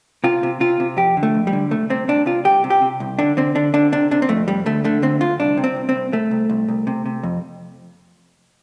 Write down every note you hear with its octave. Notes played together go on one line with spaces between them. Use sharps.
C3 F4
C3
C3 F4
C3
F2 G4
D3
A3
F2
G3
D3
C2 A3
C3 C4
C3 D4
C3 F4
C2 G4
C3
G4
C3
C2
D3 D4
D3 C4
D3 D4
D3 D4
C3 D4
C3 D4
C4
F2 A3
F2 G3
D2 A3
D3 A3
D2 C4
D2 F4
C2 D4
C3
C4
C2
C4
C2
C2 A3
C2
C2
C2
C3
C3
F2